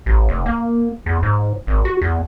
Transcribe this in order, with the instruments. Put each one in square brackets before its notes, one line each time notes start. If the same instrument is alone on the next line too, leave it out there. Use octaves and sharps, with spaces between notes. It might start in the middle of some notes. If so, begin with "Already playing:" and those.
[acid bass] A1
F1
A#3
E2
G#2
G#1
F#4
E2